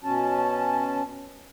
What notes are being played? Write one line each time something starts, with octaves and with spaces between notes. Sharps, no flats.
B2 C#4 A5